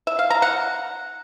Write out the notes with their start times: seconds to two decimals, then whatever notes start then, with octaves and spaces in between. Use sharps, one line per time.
0.07 E5
0.19 F5
0.30 A#5
0.42 F#5